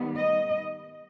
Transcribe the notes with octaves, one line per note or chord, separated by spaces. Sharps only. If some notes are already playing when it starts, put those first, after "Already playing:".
Already playing: D#3 G3 B3
D#5